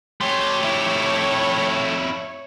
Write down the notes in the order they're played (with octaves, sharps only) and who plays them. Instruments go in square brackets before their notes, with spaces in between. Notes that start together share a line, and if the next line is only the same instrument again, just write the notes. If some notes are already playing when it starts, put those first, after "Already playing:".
[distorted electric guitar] A3 G4 [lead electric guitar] F#4 C6 [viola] C#5
[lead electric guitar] F2 E4